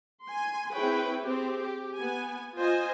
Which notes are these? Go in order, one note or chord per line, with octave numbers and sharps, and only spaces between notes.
G#5 C6
C4 E4 G#4 B4 C#5 G5
C4 G4 G#4
G4
B3 G#5
F4 C5 D#5 G#5